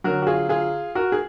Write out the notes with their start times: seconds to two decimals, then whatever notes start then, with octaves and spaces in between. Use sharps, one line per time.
0.04 D3 F#3 F#4 A#4
0.22 F#4
0.27 F4 G#4
0.49 F4 G#4
0.95 F#4 A#4
1.12 G#4